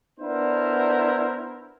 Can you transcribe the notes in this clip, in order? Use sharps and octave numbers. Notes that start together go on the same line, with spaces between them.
B3 D4 E4 A#4 C5